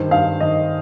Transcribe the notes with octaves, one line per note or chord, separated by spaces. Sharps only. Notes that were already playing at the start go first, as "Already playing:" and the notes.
Already playing: G2 D#3 C5
G2 F5
D#3 D#5